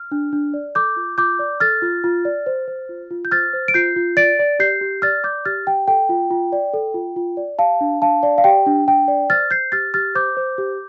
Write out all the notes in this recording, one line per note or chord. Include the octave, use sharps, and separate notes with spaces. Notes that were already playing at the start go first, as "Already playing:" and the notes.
Already playing: F6
D4
D4
D5
A4 D6 G6
F4
F4 D6 G6
D5
A4 F6 A6
F4
F4
D5
C5
C5
F4
F4
G6
C5 F6 A6
C5
D7
F4 G6 C7
F4
D5 A6 D7
D5
G4 G6 C7
G4
D5 F6 A6
D5 D6 G6
G4 F6 A6
G4 G5
A4 G5
F4
F4
D5
A4
F4
F4
D5
G4 F5 A5
D4
D4 F5 A5
D5
F5
G4 G5
D4
D4 G5
D5
C5 F6 A6
C5 G6 C7
G4 F6 A6
G4 F6 A6
C5 D6 G6
C5
G4